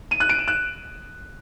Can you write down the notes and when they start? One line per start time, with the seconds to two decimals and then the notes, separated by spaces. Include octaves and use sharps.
0.11 D#7
0.20 F#6
0.29 D7
0.39 E7
0.48 F#6